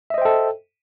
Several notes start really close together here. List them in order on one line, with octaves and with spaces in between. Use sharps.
E5 D#5 C5 G5 A4